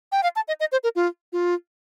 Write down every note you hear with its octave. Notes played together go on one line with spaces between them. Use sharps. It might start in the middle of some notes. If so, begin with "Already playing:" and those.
G5
F5
A5
D#5
D#5
C5
A#4
F4
F4